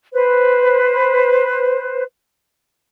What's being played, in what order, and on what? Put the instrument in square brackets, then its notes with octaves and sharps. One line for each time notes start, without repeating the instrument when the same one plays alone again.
[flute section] B4 C5